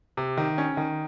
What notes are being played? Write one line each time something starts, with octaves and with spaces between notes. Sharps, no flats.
C3
D#3
C#4
D#3